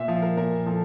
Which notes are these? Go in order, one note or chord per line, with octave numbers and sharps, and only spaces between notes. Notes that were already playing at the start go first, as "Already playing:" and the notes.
Already playing: A#2 E5
F3 F5
A#4
A#2 A#4
F3 A4